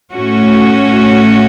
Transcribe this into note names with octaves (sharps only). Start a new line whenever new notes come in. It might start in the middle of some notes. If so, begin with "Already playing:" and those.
A2 A3 C#4 F#4